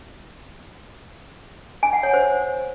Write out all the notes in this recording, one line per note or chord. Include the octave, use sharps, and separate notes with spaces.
G#5
F#5
C#5
C5